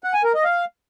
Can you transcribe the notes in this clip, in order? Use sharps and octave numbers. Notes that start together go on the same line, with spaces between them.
F#5
G#5
A#4
D#5
F5